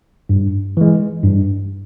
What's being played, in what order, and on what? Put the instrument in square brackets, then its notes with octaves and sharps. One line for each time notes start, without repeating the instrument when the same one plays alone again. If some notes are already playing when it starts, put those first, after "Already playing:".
[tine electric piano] G2
E3 G#3
G2